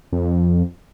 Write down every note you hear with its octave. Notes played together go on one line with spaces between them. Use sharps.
F2